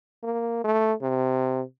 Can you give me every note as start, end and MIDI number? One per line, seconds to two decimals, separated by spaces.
0.23 0.62 58
0.64 0.93 57
1.02 1.62 48